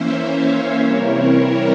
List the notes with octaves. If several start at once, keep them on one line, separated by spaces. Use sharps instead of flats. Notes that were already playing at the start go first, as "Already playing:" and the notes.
Already playing: E3 A#3 C#4 C5 E5
C#5 F5
C3 E3 G3 C4 E4 A#4 C#5